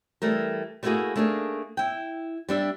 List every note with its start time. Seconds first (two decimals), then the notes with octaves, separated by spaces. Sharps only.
0.22 E3 G3 A3 A#4
0.83 G3 A3 A#3 E4 F#4 G#4
1.16 A3 A#3 D4 D#4 G#4
1.77 E4 G5
2.49 G3 D4 E5